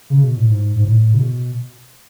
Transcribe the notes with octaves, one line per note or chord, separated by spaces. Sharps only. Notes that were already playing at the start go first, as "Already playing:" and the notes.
C#3
B2
A2
G#2
G#2
A2
C#3
B2